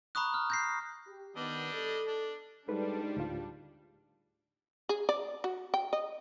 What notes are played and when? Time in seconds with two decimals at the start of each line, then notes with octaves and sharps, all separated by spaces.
0.15 A#5 B5 C#6 D#6 F#6
0.34 F6
0.50 G6 A#6 C7
1.06 G4
1.36 D#3 G3 B3 D4 D#5
1.73 A4
2.07 D4
2.68 G#2 G3 D4 A4 B4
3.17 D2 A2 F4
4.89 G#4
5.09 D5
5.44 F#4
5.74 G5
5.93 D#5